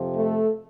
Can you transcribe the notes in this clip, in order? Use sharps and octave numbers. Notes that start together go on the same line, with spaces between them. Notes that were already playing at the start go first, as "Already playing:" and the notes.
Already playing: F2 C3 F3
A3 A4